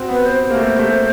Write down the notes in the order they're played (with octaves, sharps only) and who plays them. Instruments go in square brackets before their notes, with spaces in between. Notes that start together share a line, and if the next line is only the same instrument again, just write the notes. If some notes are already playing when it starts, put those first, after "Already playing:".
Already playing: [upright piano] C4 F#4
[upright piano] B3 [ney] B4
[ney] C5
[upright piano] A#3
A3
A3